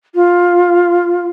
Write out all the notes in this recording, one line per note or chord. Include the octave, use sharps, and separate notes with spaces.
F4